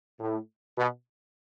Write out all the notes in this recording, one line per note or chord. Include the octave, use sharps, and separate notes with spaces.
A2
B2